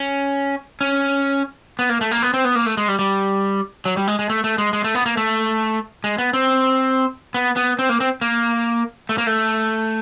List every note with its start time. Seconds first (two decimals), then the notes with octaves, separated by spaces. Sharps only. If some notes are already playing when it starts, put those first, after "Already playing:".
Already playing: C#4
0.81 C#4
1.79 B3
1.89 A#3
2.01 A3
2.11 A#3
2.22 B3
2.34 C4
2.44 B3
2.55 A#3
2.66 A3
2.77 G#3
2.88 G3
2.99 G3
3.85 F#3
3.97 G3
4.07 G#3
4.19 G#3
4.30 A3
4.44 A3
4.58 G#3
4.73 G#3
4.84 A3
4.95 B3
5.06 A#3
5.17 A3
6.04 G#3
6.18 B3
6.33 C4
7.34 B3
7.56 B3
7.79 C4
7.89 A#3
8.00 C4
8.21 A#3
9.09 A3
9.18 A#3
9.27 A3